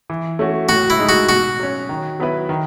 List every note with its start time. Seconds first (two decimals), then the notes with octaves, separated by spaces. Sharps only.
0.10 E3
0.39 A3 C#4 F#4
0.69 A2 F#4
0.90 E4
0.99 G#3 D#4
1.09 F#4
1.29 B2 F#4
1.59 F#3 C#4
1.89 D#3
2.20 F#3 B3 E4 B4
2.49 D#3